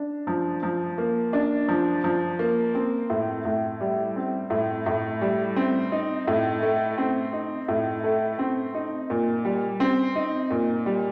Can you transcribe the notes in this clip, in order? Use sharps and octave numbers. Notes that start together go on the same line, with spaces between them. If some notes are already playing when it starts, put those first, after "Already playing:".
Already playing: D4
F3
F3
A#3
D4
F3
F3
A#3
C4
A2
A2
G3
C4
A2
A2
G3
C4
D#4
A2
A3
C4
D#4
A2
A3
C4
D#4
A#2
G3
C4
D#4
A#2
G3